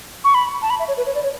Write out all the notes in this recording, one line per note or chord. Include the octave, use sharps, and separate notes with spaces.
C#6
B5
A5
B5
E5
C#5
B4
C#5
D5
C#5